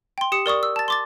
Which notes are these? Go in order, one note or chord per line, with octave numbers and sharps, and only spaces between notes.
G5 C6
G4 D#6 C#7
A#4 D5 C#6 D#6
E6
A5 A6
C6 D6 A6